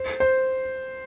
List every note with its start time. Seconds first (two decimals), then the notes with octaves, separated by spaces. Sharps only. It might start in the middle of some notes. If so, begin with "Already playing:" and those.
Already playing: C5
0.20 C5